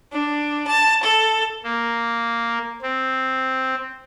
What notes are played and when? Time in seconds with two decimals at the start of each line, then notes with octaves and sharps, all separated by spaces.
0.12 D4
0.67 A5
1.03 A4
1.64 A#3
2.82 C4